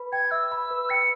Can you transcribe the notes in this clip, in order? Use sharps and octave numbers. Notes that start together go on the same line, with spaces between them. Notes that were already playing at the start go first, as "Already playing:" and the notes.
Already playing: B4 B5
G5 G#6
E5 E6
B5
B4
G5 C#7